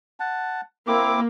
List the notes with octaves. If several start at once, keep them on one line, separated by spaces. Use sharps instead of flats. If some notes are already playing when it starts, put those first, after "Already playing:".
F#5 A5
A#3 C4 E4 D6